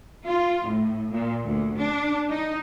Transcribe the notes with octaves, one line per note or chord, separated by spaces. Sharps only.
F4
A2
A#2
D2
D4
D#4